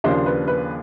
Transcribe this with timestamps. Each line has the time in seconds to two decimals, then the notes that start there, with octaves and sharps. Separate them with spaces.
0.04 D#2 C#3 F3 A#3 D4 C5
0.26 B4
0.47 B4